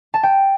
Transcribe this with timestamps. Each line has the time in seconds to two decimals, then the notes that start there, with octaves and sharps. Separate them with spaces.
0.14 A5
0.23 G5